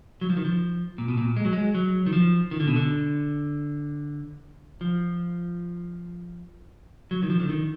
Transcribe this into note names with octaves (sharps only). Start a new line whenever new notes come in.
F#3
F3
D#3
F3
A#2
B2
A#2
G#3
F#3
G#3
F#3
D#3
F3
D#3
D3
B2
D3
F3
F#3
D#3
F3
D3
D#3